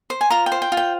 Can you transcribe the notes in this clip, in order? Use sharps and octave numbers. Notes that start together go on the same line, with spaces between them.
C5
G#5
F4 A#5
G5
C5
G5
F4
G5